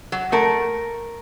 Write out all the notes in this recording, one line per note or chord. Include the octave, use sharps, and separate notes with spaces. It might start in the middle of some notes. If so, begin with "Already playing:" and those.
F#3
A3 A#4